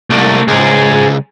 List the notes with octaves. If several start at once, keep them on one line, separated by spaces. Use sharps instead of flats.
C2 A3 A#3
C#2 G#4 C5